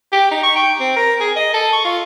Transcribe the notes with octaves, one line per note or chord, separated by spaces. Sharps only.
G4
D#4
C#6
G5
C4
A#4
G#4
D#5
A4
C#6
F4